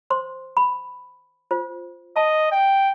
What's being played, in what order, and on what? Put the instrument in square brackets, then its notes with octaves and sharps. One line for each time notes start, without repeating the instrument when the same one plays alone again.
[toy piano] C5 C6
B5
F4 C5
[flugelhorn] D#5 [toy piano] A5
[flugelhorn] G5